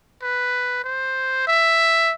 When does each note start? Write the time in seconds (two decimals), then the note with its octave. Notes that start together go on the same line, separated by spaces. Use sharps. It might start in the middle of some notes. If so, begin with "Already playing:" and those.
0.22 B4
0.84 C5
1.47 E5